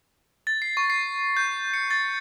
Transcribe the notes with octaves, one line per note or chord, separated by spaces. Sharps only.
A6
C7
C#6
C7
G6
C#7
A6